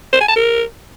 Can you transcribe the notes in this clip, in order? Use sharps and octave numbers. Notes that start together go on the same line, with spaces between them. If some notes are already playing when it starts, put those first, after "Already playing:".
C5
G#5
A5
A#4